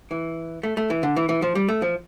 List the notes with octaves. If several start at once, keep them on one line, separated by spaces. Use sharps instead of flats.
E3
A3
A3
E3
D3
E3
E3
F3
G3
A3
F3